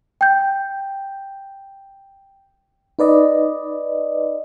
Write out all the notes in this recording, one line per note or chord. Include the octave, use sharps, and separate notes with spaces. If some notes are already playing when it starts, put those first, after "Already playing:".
G5 G6
D#4 B4 D5 D#5